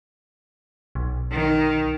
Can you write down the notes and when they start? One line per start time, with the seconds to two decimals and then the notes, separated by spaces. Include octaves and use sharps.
0.95 B1
1.32 D#3